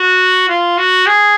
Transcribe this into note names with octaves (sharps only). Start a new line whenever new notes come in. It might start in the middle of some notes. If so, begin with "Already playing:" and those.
Already playing: F#4
F4
F#4
G#4